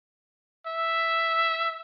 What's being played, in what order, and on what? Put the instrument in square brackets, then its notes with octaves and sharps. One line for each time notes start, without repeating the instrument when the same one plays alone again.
[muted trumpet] E5